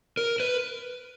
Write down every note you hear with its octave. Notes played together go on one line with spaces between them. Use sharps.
A#4
B4